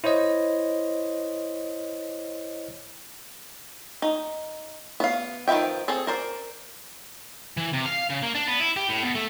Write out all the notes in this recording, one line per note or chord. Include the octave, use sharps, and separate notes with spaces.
E4 C5 C#5 D#5
D#4
B3 F5
D#3 F3 B4 E5 G5
C4 G#4 A4
A#4 C5 D5
E3
C3
F5
C#3
A#3
D4
B3
E4
G4
A2
B2
A3